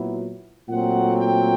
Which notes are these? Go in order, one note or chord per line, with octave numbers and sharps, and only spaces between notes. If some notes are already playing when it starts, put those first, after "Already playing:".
Already playing: A#2 F#3 B3 E4
A#2 F#3 A3 C4 F#5
G5